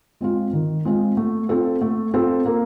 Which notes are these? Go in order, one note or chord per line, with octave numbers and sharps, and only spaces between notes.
G#3 C4 F4
D#3
G#3 C4 F4
A3
C4 F4 A4
A3
C4 F4 A4
A#3